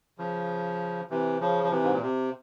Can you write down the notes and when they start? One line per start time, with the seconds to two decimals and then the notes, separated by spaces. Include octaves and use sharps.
0.18 C#3 F3
1.10 C3 E3
1.41 C#3 F3
1.64 F3
1.71 C3 E3
1.83 G#2
1.93 A#2
2.02 C3